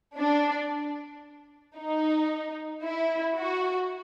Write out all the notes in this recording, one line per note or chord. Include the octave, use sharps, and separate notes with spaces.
D4
D#4
E4
F#4